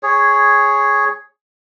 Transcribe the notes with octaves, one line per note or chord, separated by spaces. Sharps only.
G#4 C#5